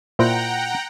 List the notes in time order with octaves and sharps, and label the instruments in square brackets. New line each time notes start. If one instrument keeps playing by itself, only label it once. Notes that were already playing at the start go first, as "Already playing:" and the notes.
[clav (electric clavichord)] A#2 E4 C5 [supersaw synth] F#5 G5 A#5